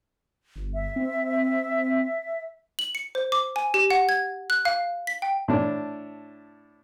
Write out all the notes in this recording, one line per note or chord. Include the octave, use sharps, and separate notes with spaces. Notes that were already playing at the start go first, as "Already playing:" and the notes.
G1
E5
C4
F#7
C#7
C5
D6
G#5
G4
F#5
G#6
F#6
F5
B6
G5
A2 D4